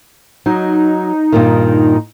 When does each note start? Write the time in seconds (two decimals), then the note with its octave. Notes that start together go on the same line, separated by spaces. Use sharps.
0.46 F#3 D#4
1.32 G2 A#2 D#3